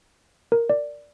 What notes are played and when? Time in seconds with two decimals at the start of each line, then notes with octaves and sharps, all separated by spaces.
0.52 A#4
0.70 D5